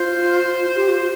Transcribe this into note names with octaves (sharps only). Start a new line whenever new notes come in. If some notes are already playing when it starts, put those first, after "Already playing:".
Already playing: F4 C5
G4
F4